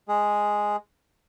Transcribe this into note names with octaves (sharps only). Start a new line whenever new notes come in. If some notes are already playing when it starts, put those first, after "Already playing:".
G#3 G#4